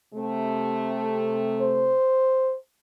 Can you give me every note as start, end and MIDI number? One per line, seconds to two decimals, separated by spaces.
0.14 1.94 48
0.14 1.94 57
1.61 2.55 72